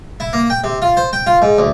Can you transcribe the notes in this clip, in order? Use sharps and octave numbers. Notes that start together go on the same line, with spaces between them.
E4
A#3
G5
C3
F4
C5
G5
F4
G#2
D2